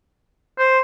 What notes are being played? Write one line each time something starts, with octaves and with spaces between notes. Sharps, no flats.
C5